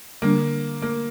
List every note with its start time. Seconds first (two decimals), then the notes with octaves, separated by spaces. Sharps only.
0.22 D3 G3 A#3 D4
0.82 A#3